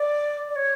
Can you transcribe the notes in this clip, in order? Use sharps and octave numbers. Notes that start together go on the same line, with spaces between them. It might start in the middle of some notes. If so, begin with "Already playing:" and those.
Already playing: D5
D5
C#5